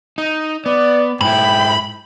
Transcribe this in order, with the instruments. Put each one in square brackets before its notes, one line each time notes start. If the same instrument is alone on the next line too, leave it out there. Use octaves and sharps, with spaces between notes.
[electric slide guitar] D#4
[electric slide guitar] B3 [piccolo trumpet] D5
[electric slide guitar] G#2 E4 [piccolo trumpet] G5 [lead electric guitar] B5